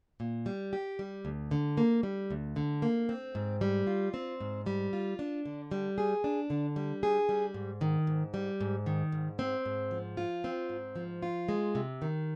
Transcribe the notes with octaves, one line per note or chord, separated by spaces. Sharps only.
A#2
G3
G4
G3
D2
D3
A#3
G3
D2
D3
A#3
C4
G#2
G3
F4
C4
G#2
G3
F4
D4
D3
G3
G#4
D4
D3
G3
G#4
G3
G#2
D#3
G#2
G3
G#2
D#3
G#2
C4
G#2
F3
F4
C4
G#2
F3
F4
G#3
C3
D#3